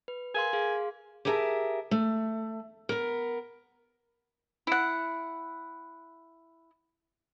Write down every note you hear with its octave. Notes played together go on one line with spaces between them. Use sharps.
B4
A#4 F5 G#5 C6
G#4 F5 C6
G4 G#4 A#4 E5 G#5 A5
A3
B3 A#4
E4 F#5